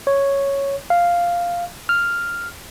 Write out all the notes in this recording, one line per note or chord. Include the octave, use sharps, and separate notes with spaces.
C#5
F5
F6